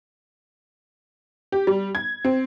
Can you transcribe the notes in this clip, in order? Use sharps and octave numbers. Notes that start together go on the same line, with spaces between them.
G4
G3
G#6
C4